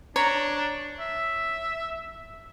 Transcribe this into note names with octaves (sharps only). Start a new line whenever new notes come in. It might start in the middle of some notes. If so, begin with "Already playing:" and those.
D4 C#5 A#5 C#6
E5